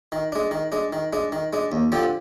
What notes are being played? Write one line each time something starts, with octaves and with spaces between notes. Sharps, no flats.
D#3
G#3 D4
D#3
G#3 D4
D#3
G#3 D4
D#3
G#3 D4
D#2
D3 F3 C4 G4